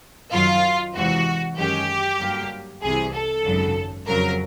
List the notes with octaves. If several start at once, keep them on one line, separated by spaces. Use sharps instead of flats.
F#2 D#3 F#3 F4
E2 C3 E3 G#3 C4 F#4
F#2 D#3 G#3 C#4 G4
G2 D3 F#3 A#3
C2 C3 E3 G#4
A4
G#1 F#2 C#3 F#3
F2 C#3 F#3 A#4